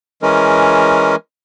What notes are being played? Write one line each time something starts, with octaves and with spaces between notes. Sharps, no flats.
E3 G#3 C#4 A#4